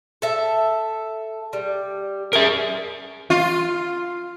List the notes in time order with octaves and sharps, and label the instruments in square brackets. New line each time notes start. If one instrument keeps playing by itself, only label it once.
[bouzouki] A4 E5
G3
[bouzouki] G#4 [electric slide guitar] A#4 E5
[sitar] F4